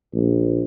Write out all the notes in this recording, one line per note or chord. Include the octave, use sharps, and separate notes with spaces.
A#1